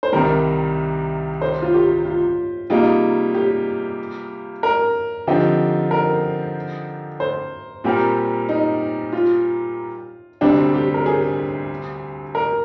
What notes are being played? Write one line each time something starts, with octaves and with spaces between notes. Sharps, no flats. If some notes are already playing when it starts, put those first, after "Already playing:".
C5
C2 C3 D#3 G3 A#4
C5
F4
G4
F4
C3 G3 A#3 D#4 F4 G#4
G4
A#4
D3 F3 C4 D#4 G4
A#4
C5
A#2 G3 C4 G4 A#4
D#4
F4
D2 C3 G3 C4 D4
G4
A#4
G#4
A#4